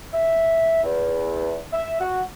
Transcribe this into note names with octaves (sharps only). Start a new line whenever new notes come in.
E5
E2
E5
F#4